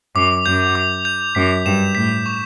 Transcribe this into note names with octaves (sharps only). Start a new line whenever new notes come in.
F#2 D6
F#2 G6
D6
G6
F#2 B6
G2 E7
A2 B6
C#6